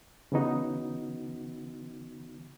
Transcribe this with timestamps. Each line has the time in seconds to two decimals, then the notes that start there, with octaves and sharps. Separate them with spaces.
0.32 C#3 E3 B3 D#4 F#4